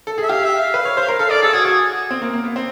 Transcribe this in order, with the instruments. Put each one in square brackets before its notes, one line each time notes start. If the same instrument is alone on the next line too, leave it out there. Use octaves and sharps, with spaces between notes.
[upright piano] A4
[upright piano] G#4 [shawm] E5
[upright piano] G4 [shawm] F5
[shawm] E5
F5
[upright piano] B4
C#5
C5
A#4
[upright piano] A4 [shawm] F5
[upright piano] A4 [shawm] D5
[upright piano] G#4 [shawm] A4
[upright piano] F#4 [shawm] G#4
[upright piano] F#4 [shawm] G#4
[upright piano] C4
A#3
A#3
B3
C4